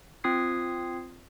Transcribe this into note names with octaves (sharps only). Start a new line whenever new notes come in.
C4 F4 D#6 G#6 C7